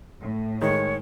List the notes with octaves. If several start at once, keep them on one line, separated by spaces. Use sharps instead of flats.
A2
D#3 G#3 C#5